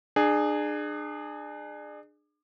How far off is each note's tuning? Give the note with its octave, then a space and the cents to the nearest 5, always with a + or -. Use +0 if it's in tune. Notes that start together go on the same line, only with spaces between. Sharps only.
D4 +35 G#4 +0